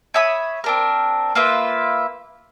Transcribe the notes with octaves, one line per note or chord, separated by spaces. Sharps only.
C#5 E5 B5 D#6
C4 D4 A#4
A#3 F4 B4 E5